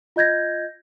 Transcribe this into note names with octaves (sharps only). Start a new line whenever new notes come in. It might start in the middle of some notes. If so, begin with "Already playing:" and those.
F4 D#5 G6 G#6 A#6